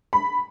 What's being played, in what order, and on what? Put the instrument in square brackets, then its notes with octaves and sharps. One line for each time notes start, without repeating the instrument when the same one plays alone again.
[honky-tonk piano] B5